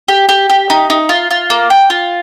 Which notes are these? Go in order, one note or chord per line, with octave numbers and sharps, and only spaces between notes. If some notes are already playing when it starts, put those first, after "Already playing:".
G4
G4
G4
D#4
D#4
F4
F4
A#3
G5
F4